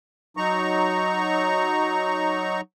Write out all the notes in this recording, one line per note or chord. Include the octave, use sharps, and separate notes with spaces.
F#3 D#4 A#5 C#6